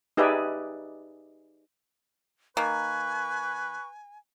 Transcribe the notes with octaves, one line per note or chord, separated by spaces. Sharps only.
D#4 G4 G#4 B4 D5 E5
D#3 A#3 B4 G#5 C#6